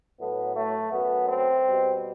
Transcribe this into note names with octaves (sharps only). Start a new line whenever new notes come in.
A2 F#3 A3 B3
A3
F#2 F#3 A3 B3
C4
B2 G3